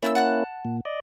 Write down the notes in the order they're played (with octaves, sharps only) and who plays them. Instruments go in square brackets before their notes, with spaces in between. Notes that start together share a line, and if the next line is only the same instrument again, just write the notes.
[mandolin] A3 G5 E6 [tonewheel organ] A#3 C#4 E4
[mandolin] F#5 A5 F#6
[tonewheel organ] A#2
D5 D#5